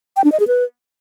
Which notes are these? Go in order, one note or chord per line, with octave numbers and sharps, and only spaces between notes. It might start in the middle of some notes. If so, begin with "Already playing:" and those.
G5
D4
D#5
G#4
B4